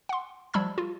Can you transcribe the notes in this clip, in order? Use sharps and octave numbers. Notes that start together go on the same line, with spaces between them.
F#5 C6
F3 G3 A5 B5 E6 G#6
F4